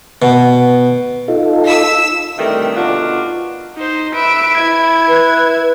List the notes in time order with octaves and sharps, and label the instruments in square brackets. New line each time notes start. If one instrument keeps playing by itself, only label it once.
[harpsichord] B2
[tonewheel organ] D#4 F4 A4
[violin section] E6 B6
[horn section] G2 C3 D#3 E3 G3 A3
B2 D3 D4 D#4 F4 F#4
[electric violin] D#4 C5
[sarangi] B4 [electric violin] E5 D7
[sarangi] E4 [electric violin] G#6
[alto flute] B4